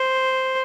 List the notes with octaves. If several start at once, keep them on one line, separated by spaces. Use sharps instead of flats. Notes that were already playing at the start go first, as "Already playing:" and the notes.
Already playing: C5